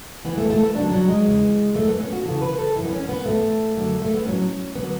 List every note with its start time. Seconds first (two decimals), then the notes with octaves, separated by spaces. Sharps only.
0.25 F#2 E3 B3
0.38 A3
0.50 A3
0.62 B3
0.75 D2 C#3 F#3 D4
0.92 F#3
1.08 G#3
1.25 E2 C#3 E3
1.75 F#2 E3 A3
1.88 B3
2.00 C#4
2.13 F#4
2.25 F#2 C#3 E3 A4
2.42 B4
2.59 A4
2.75 F#2 E3 E4
2.85 B3
2.92 C#4
3.09 B3
3.25 A2 E3 A3
3.75 F#2 D3 F#3
4.02 A3
4.14 B3
4.25 A2 F#3 C#4
4.75 D3 F#3 B3